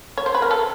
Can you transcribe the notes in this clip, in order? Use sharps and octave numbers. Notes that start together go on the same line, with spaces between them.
C#5
C5
B4
A#4
A4